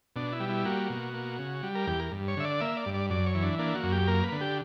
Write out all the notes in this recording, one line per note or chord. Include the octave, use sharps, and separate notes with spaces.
B2 D4
E4
G3
E4
A#3 F#4
B2
A#3
C#3
G3
A#4
E2 G4
A#4
G2
C#5
D3 E5
D5
A#3 E5
D5
G2
D5
F#2 D5
C#5
E3
D4
A#3 D4
F#4
F#2
G4
A#3 A#4
B4
D3
G4